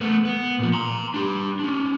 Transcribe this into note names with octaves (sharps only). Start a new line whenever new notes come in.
A3 B3
B3
A#2 F3
A#5 C6
D4 G4
C#4 D4